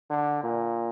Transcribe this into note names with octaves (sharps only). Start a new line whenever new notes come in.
D3
A#2